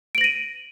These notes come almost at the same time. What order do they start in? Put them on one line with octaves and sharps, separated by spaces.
D7 F#7 A#6 D#7